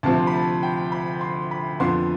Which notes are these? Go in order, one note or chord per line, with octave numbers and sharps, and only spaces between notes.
D2 C3 F3 C4 A5
B5
A5
G5
B5
C6
B5
F2 D3 F3 B3 C6